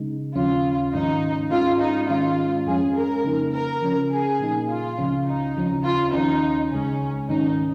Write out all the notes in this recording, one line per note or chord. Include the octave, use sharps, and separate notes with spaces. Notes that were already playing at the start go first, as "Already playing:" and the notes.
Already playing: C#3 G#3 D#4
D#2 C#3 F3 C#4 F4
G#2 D#3 C#4 D#4
G#2 G#3 C#4 F4
D#4
G#2 D#3 G#3 C#4 F4
F2 F3 G#3 C#4 G#4
A#4
C#3 A#3 D#4
A#4
C#3 F3 C#4
G#4
A#2 A#3 D#4
F4
C#2 C#3 F3 C#4
D#4
D#2 C#3 F3 C#4
F4
D#2 D#3 C#4 D#4
C#2 C#3 G#3 C#4
G#2 D#3 C#4 D#4